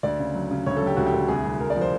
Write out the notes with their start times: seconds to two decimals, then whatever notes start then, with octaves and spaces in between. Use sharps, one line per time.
0.03 D2 D5
0.19 C#3
0.34 F#3
0.51 C#3
0.66 D2 C#5
0.77 A4
0.82 F#3
0.87 G4
0.97 D2 F#4
1.06 G4
1.14 D2
1.28 C2 G#4
1.44 C2
1.60 C2 A#4
1.70 D5
1.76 F3 C5